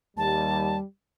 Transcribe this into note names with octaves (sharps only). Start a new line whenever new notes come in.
D#2 G3 A5